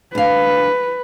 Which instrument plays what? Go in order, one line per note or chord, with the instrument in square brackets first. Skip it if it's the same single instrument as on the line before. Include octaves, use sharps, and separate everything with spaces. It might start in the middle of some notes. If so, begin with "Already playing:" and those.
[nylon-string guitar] D2 F5 [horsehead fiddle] B4